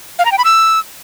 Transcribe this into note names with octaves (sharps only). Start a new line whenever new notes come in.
F5
A#5
G5
B5
E6